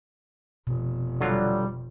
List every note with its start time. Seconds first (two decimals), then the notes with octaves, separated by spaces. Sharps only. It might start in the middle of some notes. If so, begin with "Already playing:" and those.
0.67 F1 B2
1.21 D3 F#3 G3 F4